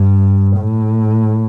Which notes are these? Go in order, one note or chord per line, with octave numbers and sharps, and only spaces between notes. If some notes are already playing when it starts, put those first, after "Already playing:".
Already playing: G2
A2